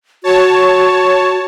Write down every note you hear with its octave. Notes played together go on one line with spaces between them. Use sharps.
F#4 C#5 A5